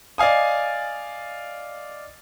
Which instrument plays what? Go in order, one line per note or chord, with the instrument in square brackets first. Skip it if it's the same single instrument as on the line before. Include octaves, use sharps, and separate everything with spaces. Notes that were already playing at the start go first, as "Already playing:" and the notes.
[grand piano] D5 D#5 F5 G#5 D#6